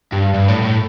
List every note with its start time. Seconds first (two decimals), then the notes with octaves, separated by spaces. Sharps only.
0.13 G2
0.34 G2
0.49 A2
0.63 A2